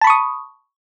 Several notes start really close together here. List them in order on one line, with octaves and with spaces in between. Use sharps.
A5 B5 C#6 D#6